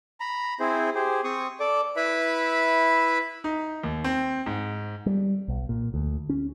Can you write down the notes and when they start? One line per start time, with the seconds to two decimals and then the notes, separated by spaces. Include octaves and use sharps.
0.20 A#5 B5
0.60 C4 E4 G#4 C5
0.95 G4 G#4 C5
1.24 C4 C#6 D#6
1.60 A4 D5 D6
1.96 E4 B4 E5 B5
3.44 D#4
3.83 D#2
4.04 C4
4.46 G#2
5.06 G3
5.48 B1
5.69 A#2
5.94 D2
6.29 C#4